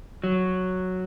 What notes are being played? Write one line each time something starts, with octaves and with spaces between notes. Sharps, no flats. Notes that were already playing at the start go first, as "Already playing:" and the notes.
F#3